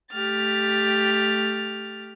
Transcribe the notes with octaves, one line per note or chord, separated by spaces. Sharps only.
A3 G4 F6 A6